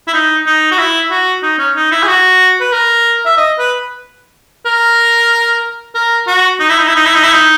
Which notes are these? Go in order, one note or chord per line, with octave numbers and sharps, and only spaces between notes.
E4
D#4
D#4
F#4
E4
F#4
D#4
C#4
D#4
E4
G#4
F#4
B4
A#4
E5
D#5
B4
A#4
A#4
F#4
D#4
E4
D#4
E4
D#4
E4
D#4
E4
D#4